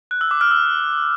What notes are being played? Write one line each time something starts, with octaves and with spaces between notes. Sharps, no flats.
F#6
E6
D6
F6
E6